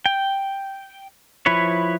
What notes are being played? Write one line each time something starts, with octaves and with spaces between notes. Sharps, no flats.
G5
F3 E4 B4 C#5